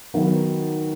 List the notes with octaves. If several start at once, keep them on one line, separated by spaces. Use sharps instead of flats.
D#3 F#3 B3 F#4